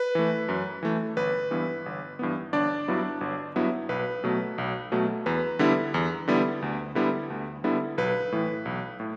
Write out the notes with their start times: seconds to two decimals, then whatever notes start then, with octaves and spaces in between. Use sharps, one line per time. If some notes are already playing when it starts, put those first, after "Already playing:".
Already playing: B4
0.15 E3 A3
0.49 F#2
0.83 E3 A3
1.17 G1 B4
1.51 G2 E3 B3
1.86 G1
2.19 G2 E3 B3
2.53 G1 D4 D5
2.88 G2 F#3 B3 E4
3.21 G1
3.56 G2 F#3 B3 E4
3.89 B1 B4
4.24 B2 F#3 A3
4.58 B1
4.92 B2 F#3 A3
5.26 E2 B4
5.59 D3 G3 B3 E4
5.94 E2
6.28 D3 G3 B3 E4
6.62 D2
6.95 D3 G3 B3 E4
7.30 D2
7.64 D3 G3 B3 E4
7.98 B1 B4
8.32 A2 E3
8.65 B1
9.00 A2